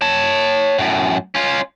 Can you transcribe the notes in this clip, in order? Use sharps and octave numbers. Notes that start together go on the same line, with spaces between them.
C#5 A5
F#2 A2
C#4 F4